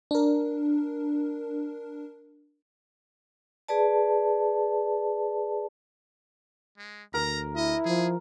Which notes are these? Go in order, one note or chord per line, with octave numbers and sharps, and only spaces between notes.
D4 A#4
G#4 B4 D5 A5
G#3
D2 A#4 A#5
E4 D#5
F3 G#4